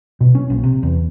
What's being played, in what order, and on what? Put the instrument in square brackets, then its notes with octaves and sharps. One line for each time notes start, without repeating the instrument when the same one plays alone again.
[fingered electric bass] B2
C#4
A#1
C3
E2